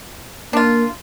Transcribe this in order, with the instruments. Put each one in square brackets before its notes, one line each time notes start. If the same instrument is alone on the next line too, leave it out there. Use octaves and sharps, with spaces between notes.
[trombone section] A#3 [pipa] D4 F4